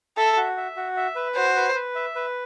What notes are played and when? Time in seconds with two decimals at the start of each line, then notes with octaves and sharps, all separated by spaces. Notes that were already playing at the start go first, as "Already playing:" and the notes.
0.17 A4 E5
0.37 F#4
0.57 E5
0.76 F#4
0.97 E5
1.16 B4
1.36 F#4 C5
1.56 B4
1.75 B4
1.95 E5
2.15 B4